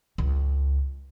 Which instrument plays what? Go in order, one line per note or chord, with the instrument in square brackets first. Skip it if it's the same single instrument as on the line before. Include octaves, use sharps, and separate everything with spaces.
[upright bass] C#2